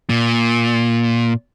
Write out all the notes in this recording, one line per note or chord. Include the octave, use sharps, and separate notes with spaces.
A#2